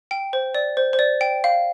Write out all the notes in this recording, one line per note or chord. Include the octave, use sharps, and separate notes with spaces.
G5
C5
D5
C5
C5
D5
G5
F5